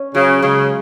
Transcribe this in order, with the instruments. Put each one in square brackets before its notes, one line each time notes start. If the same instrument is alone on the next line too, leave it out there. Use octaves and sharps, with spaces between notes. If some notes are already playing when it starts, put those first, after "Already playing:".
Already playing: [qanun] C#4
[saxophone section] C#3 [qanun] F#3
[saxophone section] C#3 [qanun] G#3